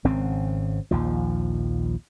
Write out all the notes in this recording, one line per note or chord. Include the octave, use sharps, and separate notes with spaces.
G#1 C#3 C4
A#1 D#2 F3